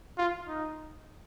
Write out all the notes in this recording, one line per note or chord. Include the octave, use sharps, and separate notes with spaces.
F4
D#4